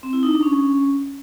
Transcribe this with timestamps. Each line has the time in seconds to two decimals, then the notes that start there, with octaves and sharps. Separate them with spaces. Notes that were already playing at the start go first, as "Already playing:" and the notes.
0.03 C4
0.13 E4
0.23 D#4
0.33 D4
0.43 C#4